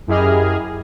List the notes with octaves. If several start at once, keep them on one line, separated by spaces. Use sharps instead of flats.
F#2 E4 G4 G#4 D#5 F6